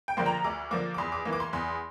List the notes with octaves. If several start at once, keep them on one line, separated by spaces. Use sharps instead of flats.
G5
D3 F3 A#3 C6
A#5
D2 D6
D3 F3 A#3 D6
D6
E2 C6
D6
E3 A#3
D6
C6
E2 C6